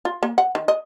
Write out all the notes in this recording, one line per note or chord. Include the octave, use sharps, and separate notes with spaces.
F4
A#3
F#5
D#3
D#5